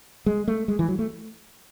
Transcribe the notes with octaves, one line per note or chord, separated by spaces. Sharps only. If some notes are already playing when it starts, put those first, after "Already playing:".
G#3
A3
G#3
E3
F#3
A3